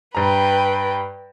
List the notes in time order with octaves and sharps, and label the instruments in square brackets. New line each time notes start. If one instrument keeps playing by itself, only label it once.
[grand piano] G2 A#5 [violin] B4 G5